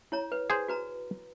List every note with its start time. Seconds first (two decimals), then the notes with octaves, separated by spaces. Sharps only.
0.12 E4 C#5 A#5
0.32 B4
0.50 G#4 C5
0.68 F#4 B4 A#5